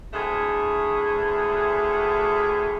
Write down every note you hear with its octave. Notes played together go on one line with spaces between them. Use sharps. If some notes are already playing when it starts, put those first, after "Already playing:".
D2 A2 A3 G#4